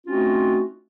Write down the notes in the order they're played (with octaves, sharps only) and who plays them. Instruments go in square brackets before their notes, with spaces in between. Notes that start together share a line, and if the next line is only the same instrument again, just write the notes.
[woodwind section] A3 C4 C#4 D#4 F4 F#4